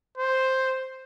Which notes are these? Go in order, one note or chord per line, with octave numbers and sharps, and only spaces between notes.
C5